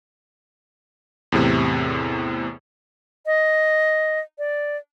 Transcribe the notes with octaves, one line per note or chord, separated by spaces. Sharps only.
E2 A2 C3
D#5
D5